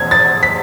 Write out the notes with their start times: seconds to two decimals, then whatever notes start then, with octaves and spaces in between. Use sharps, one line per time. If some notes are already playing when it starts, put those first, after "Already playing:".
Already playing: E2 B2 G#6
0.11 A6
0.43 B6